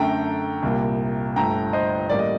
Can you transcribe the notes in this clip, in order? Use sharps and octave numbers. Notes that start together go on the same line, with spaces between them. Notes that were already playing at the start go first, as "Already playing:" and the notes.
Already playing: F#2 D3 A3 G5 A#5
C2 A#2 G3 A#3
G1 G2 D3 A3 G5 A#5
C5 D#5
A1 A2 G3 A#3 D5
D#5